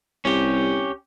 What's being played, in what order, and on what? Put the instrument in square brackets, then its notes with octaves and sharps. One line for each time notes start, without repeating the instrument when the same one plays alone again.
[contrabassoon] C2 [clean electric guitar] C#4 G4